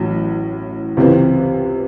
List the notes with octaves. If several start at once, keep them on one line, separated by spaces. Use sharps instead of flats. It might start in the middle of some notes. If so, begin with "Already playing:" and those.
Already playing: A1 A2 F#3
C#2 C3 E3 C4